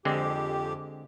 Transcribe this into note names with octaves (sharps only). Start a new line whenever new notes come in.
F2 D3 G#3 C4 G4